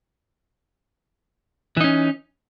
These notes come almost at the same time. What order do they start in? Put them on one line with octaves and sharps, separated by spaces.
E3 D#4 C#4